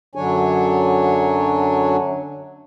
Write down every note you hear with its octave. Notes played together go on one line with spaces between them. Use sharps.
F#2 D3 F#3 D4 C#5 G#5